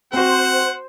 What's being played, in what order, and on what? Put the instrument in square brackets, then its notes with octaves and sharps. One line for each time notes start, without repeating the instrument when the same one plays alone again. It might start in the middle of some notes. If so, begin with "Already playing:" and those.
[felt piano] C4 F#4 [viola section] C5 [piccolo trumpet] F#5